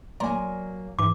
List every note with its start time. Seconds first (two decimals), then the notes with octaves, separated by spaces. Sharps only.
0.20 F#3 A#3 D5 G#5 A#5 C6
0.99 G#2 E3 D6